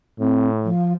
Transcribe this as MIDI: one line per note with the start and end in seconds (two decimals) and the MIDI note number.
0.19 0.69 45
0.19 0.47 60
0.63 0.92 53